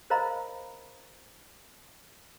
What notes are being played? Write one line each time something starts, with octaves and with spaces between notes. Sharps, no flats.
A#4 C5 D#5 F5 A#5 B5